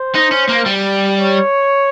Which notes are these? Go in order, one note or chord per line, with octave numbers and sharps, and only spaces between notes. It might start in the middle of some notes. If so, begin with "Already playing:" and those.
Already playing: C5
D#4
C#4
A#3
G3
C#5